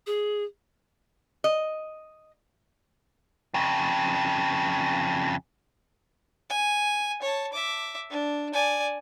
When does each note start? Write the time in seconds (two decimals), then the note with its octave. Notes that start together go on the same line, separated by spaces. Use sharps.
0.07 G#4
1.44 D#5
3.54 F2 C#3
6.50 G#5
7.22 C#5 A5
7.53 E5 D6
8.10 D4
8.53 D5 G#5